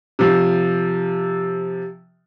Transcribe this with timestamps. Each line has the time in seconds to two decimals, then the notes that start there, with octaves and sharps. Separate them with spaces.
0.19 C3 F3